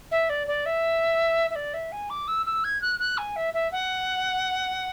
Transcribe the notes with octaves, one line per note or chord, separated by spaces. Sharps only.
E5
D5
D5
E5
E5
D5
E5
G#5
D6
E6
E6
G#6
F#6
F#6
G#5
E5
E5
F#5